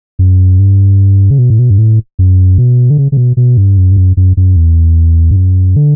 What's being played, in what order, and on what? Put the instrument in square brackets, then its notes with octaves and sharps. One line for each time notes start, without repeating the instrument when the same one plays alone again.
[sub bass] F#2
G2
C#3
B2
A2
B2
G2
A2
F#2
B2
D3
C#3
C#3
B2
B2
G2
F#2
G2
F#2
F#2
F#2
E2
G2
F#2
D3